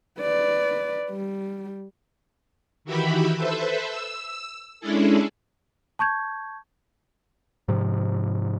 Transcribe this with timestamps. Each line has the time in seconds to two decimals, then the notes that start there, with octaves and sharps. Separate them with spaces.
0.20 B4 D5
1.10 G3
2.85 D#3 E3 F#4 G4 E5 B5
3.36 A4 B4 C5 E5
3.89 E6
4.80 G#3 C#4 D4 E4 G#4 A4
5.99 A5 C#6 G6 G#6
7.68 G#2 C3 F3